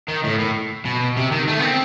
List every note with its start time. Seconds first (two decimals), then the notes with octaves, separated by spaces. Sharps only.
0.08 D#3
0.24 A2
0.39 A2
0.85 B2
1.17 C3
1.32 D#3
1.48 A3
1.59 B3
1.63 C4